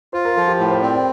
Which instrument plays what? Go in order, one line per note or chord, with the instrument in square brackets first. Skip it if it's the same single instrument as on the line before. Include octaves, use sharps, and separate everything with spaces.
[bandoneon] F4 [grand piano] C5
[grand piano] A#4
[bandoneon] F3 [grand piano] A4
[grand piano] G4
[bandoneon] A2
[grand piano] C5
[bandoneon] C4 [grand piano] D5
[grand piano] D5